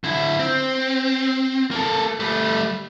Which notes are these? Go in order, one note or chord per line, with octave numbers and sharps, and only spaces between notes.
D3 E4
C4
A#3 A4
G3 A3